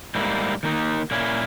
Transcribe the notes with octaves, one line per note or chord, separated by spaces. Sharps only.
G#2 G3 A#3 E4
D#3 A#3 D#4
A#2 A#3 C#4 E4